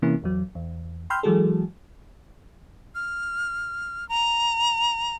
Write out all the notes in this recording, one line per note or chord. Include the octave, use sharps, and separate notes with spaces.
C3 E3 A#3 C#4 E4
A1 E2 F#3
E2
G5 B5 C6 E6 F6 G6
E3 F#3 G#3 F#4 G#4 A4
F6
A#5